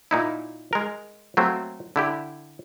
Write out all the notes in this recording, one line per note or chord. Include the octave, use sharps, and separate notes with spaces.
A#2 D#4 E4
G#3 A#4
F#3 A3 A#3 C4
D3 E4 G4